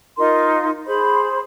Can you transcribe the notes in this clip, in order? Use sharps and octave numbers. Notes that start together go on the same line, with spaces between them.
D#4 F4 A#4 C6
G#4 C5 B5